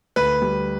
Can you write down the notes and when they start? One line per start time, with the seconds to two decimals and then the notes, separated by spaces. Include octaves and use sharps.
0.16 D2 B4
0.42 G3